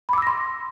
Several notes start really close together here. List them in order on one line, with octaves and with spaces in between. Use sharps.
B5 D6 E6 A#6 C6